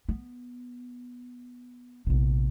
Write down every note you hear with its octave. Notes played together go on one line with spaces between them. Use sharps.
B3
A#1 C3